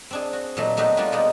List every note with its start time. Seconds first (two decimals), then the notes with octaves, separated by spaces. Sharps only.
0.11 C4 D4 G#4
0.33 F#4
0.57 A#2 F#3 A3 D#4
0.77 F#3 A3 B3 D4 D#4 G4
0.97 G3 A#3 B3 D4 F4 F#4
1.12 B2 G#3 A#3 B3 D#4